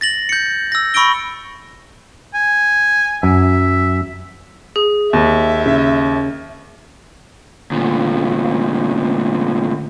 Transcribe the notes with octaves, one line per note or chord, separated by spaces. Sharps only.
A6 A#6 F#7
G6 C#7
E6 A#6
B5 C#6 E6 A#6 D7 G7
G#5
F#2 E5
G#4
D#2 E5
C#3
D2 A#2